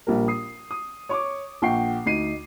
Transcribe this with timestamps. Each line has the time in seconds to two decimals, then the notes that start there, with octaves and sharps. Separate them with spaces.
0.07 A#1 G3 A#4
0.28 D#6 C7
0.71 D#6
1.09 C#5 C#6 D6
1.62 A#1 F#5 G5 C#6 C7
2.06 D2 D#4 C7 D#7